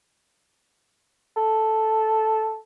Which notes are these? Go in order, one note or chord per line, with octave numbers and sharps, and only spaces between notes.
A4